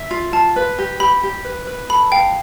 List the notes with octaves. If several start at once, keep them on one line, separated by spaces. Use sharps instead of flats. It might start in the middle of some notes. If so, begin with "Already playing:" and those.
Already playing: E5
F4
F4 A5
B4
G4
G4 B5
G4
B4
B4
A4 B5
F5 G5